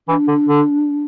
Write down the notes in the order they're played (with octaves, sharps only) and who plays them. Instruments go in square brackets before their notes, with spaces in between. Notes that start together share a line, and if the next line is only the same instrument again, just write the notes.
[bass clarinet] E3 [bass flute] D4
[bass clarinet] D3
D3